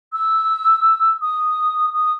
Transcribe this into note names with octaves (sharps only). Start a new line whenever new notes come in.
E6
D#6
D#6